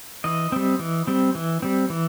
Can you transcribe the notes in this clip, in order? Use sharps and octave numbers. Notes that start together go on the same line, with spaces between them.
E3 D#5
G3 C4
E3
G3 C4
E3
G3 C4
E3